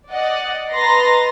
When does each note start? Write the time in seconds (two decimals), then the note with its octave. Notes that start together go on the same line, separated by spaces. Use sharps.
0.11 D5 D#5 F#5
0.72 B4 D#5 A#5 C6 A6 A#6